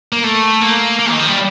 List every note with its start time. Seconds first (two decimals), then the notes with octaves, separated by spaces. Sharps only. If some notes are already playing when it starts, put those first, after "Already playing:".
0.13 A#3
0.24 A3
0.62 A#3
0.99 A#3
1.12 D#3
1.20 F3
1.28 G3